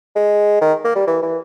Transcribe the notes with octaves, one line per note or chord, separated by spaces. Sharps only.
G#3
D#3
A#3
G3
E3
E3